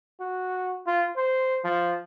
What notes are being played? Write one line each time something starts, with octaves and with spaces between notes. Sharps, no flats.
F#4
F4
C5
F3